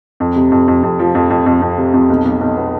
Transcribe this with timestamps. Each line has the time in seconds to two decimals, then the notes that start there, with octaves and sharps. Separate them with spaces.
0.20 F2
0.36 C3
0.52 F2
0.68 F2
0.83 F2
0.99 F3
1.15 F2
1.30 F2
1.46 F2
1.62 F2
1.78 C3
1.94 F2
2.10 B1
2.25 B1
2.41 B1
2.57 B3